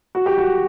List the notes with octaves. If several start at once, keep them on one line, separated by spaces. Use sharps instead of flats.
F#4
G4
F#4